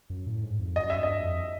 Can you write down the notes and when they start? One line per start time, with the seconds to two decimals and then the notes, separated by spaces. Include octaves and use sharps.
0.10 F#2
0.27 A2
0.43 G#2
0.59 F2
0.76 F#2 D#5
0.90 E5
0.98 G2
1.03 D#5
1.20 F2